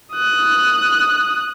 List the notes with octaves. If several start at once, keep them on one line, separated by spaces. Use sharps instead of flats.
D#6 F#6